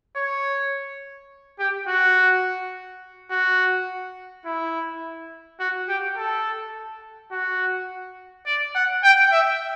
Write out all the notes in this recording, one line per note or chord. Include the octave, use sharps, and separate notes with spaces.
C#5
G4
F#4
F#4
E4
F#4
G4
A4
F#4
D5
F#5
G5
E5